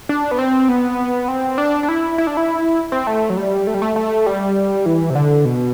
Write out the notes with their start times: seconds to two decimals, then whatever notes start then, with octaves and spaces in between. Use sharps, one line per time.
0.09 D4
0.31 B3
0.39 C4
0.68 B3
1.28 C4
1.58 D4
1.83 D4
1.89 E4
2.18 E4
2.27 D4
2.37 E4
2.92 C4
3.07 A3
3.30 F#3
3.37 G3
3.67 A3
3.74 G3
3.82 A3
3.96 A3
4.26 G3
4.86 E3
5.10 C3
5.15 D3
5.45 B2